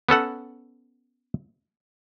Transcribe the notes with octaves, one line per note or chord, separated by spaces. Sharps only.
B3 C#4 A4 F#5